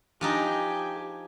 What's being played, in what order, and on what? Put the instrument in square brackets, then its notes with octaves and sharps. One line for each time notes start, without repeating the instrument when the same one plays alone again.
[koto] F3 D4 D#4 [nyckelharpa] G4 G#5